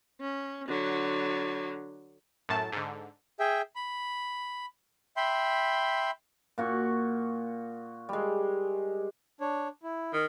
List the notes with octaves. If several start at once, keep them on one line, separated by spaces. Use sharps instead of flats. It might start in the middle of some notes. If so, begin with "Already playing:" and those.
C#4
D3 F#3
F#2 A2 A5
G#2 D3
G#4 E5 G5
B5
E5 G5 B5 C6
A#2 F#4 C#6
G3 G#3
D4 C#5
E4
D#3